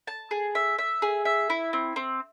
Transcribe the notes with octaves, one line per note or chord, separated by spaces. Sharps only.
A5
G#4
E5
E5
G#4
E5
E4
C4
C4